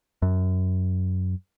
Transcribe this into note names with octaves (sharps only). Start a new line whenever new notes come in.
F#2